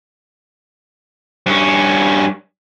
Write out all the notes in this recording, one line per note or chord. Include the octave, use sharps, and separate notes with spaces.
G2 C#4